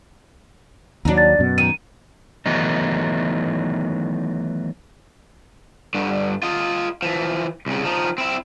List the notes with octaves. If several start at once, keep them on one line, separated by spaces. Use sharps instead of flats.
D#2 F#3 D4 D#4
A6
F#2 B2
D#3 D#7
D#3 E3 F#3 A3 B3 D#4
G2 D3
F4 D#5
E3 F3
C2 C#3
F3 D#4
C4 E4